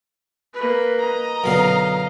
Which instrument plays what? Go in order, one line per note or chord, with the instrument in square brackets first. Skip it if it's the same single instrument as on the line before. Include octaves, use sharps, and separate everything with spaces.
[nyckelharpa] A#3 B4
[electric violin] D#5 A#5
[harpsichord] F#2 B2 D3 [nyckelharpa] F5